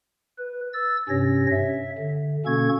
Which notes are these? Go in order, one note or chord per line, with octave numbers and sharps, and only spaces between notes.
B4
E6 A6
G2 C3 C#4 C#5 A#6
E5
D3
B2 A#3 C#4 A4 C#6 G#6